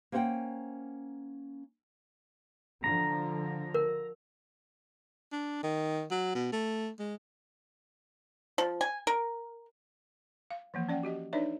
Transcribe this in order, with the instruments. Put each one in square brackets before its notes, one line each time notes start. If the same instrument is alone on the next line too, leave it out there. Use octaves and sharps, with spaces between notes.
[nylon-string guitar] A#3 C#4 C5 D5 F#5 G5
[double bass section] D3 F3 [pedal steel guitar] A#5
[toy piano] A#4
[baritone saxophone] D4
D#3
F#3
B2
A3
G#3
[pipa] F3
G#5
A#4
[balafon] F5
E3 F3 A#3
C#4 D5 F#5 G5
F#4 G4 D#5
D4 D#4 B4 C#5 D5 E5